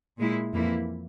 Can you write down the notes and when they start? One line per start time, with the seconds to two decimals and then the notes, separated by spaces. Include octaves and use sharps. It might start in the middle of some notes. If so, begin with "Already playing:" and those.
0.19 A#2 G#3 E4
0.54 F2 E3 A#3 E4